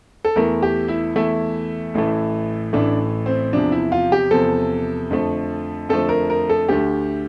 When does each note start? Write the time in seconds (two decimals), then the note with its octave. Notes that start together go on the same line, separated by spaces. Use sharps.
0.25 A4
0.36 E2 E3 A3 A#4
0.62 G4
0.88 E4
1.15 E2 E3 A3 E4
1.94 A1 A2 E3 A3
2.73 A1 A2 E3 A3 D4
3.26 C4
3.52 E2 C3 F3 D4
3.72 E4
3.92 F4
4.12 G4
4.31 E2 C3 F3 A4
5.11 F2 D3 F3 A3
5.89 F2 D3 F3 A3 A4
6.09 A#4
6.30 A#4
6.50 A4
6.68 D2 D3 A3 G4